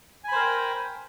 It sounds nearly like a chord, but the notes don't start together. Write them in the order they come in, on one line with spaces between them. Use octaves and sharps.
G#5 B5 C5 A#4 G5